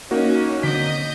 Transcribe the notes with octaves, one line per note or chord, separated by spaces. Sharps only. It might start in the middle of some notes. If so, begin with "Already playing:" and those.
A#3 C#4 D#4 F#4
D3 C4 D#5 G6 B6